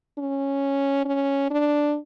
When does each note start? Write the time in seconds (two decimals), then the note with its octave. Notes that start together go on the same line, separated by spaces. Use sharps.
0.18 C#4
1.05 C#4
1.51 D4